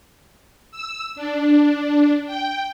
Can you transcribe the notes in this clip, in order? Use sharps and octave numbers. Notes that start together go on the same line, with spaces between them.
E6
D4
G5